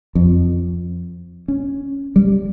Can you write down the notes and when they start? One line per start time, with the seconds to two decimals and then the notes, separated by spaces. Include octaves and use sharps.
0.15 F2
1.48 C#4
2.16 G3